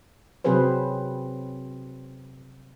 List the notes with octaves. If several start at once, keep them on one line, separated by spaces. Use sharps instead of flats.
C3 F#3 C4 G#4 B4 C5